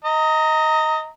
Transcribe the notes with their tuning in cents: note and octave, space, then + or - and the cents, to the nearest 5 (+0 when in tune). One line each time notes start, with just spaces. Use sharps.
D#5 +15 A#5 -20